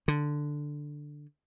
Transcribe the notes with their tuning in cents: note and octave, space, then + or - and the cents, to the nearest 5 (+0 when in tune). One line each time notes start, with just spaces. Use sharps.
D3 +5